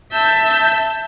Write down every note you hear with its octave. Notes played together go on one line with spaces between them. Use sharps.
E5 A5 E6 G6